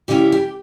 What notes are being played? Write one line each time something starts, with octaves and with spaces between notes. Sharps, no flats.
C#3 G3 C#4 E4 G4
G4